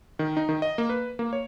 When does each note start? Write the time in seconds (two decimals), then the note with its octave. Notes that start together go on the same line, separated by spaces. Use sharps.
0.19 D#3
0.37 D#4
0.49 D#3
0.62 D#5
0.78 A#3
0.89 B4
1.19 A#3
1.33 C#5